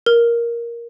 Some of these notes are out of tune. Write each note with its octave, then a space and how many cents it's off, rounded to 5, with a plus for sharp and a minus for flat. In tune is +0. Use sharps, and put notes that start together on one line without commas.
A#4 +10